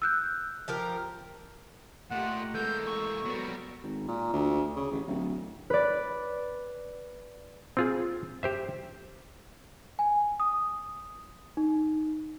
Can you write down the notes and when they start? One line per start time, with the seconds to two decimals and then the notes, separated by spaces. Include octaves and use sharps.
0.02 E6 F#6 G6
0.68 F3 G4 A#4
2.11 A#2 A3 G4 D#5 F#5
2.54 E3 G#3 A#3 A4 G6
2.86 C#6
3.25 F#3 G3 B3 F#4 A#4
3.83 G#1
4.08 A#2
4.34 D2
4.76 C#3
4.91 A1
5.07 D1
5.70 B4 D5
7.77 C4 F4 G#4
8.43 G4 C5 E5
9.99 G#5
10.40 D#6
11.57 D#4